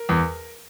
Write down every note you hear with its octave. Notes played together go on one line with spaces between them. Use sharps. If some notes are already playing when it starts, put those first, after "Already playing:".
Already playing: A#4
E2